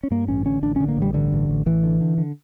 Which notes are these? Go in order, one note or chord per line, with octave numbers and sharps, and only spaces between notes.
C#4
G2 A#3
A1 C#4
D3 C#4
A1 D4
D3 C#4
A#3
A1 G3
G2 D3
A1
A1
A1 E3
D3
D3
D3